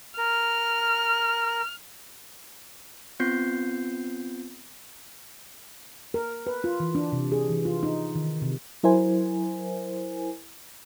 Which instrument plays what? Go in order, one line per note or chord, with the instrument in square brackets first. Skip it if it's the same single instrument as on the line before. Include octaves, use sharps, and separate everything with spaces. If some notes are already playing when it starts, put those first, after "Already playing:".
[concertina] A#4 [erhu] F6
[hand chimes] B3 C4 F4 G6 C7
[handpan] A#4
B4
F4
E3
D4
C3
G#4
E3
F4
D#4
D#3
C3
[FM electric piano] F#3 E4 A#4 C5 G#5